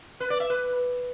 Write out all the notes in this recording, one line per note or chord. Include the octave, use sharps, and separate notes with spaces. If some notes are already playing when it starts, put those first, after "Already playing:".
B4
D5
E5
B4